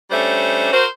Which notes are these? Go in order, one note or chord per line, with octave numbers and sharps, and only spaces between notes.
G3 A3 C#4 D4 C5
F#4 A#4 C5